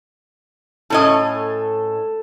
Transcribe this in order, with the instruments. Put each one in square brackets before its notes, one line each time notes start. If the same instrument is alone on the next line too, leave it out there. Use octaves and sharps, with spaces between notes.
[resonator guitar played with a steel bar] A2 C#4 D#5 [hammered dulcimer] A4